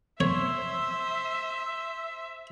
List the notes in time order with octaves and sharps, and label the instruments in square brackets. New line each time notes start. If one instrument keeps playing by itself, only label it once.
[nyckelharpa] C5 [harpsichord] C#5 [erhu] E5